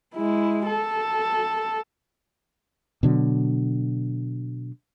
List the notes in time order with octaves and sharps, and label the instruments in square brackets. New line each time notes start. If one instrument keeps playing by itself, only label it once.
[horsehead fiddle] G#3 E4
A4
[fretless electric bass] B2 D3 F#3